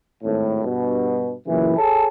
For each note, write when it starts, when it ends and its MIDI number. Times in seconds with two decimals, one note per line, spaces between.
0.24 0.64 32
0.24 0.64 45
0.65 1.34 43
0.65 1.34 47
1.47 1.76 42
1.47 1.76 46
1.47 1.76 49
1.47 1.76 52
1.78 2.08 68
1.78 2.08 69
1.78 2.08 73
1.78 2.08 80
1.78 2.08 81